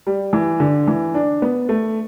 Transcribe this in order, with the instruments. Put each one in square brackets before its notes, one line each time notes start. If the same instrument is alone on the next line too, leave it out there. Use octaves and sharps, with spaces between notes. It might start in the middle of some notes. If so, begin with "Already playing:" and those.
[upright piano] G3
E3
D3
E3
D4
B3
A3